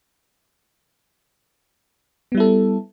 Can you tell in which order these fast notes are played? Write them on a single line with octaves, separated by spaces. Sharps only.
B3 G3 E4 A4